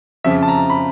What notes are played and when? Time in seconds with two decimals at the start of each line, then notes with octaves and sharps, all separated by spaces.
0.24 F2 C#3 F3 E5
0.43 A5
0.48 A#5
0.70 B5